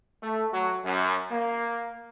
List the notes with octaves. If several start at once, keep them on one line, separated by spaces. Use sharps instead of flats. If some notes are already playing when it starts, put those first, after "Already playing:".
A3
F#3
F#2
A#3